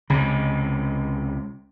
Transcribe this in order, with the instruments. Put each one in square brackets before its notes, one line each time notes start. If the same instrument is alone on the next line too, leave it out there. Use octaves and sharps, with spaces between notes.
[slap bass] C#2 C3